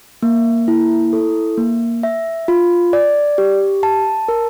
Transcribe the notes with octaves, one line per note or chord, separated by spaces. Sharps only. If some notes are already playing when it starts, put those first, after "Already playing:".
A#3
E4
A4
A#3
E5
F4
D5
G4
A5
A#4